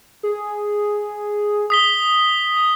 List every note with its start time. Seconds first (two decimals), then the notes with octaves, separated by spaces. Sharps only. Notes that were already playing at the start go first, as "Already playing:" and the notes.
0.23 G#4
1.70 D#6 B6 G7
2.56 D#6